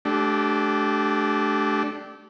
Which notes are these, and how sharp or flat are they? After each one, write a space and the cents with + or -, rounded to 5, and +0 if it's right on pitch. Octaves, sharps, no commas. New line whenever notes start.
A3 -35 D4 +0 G4 -25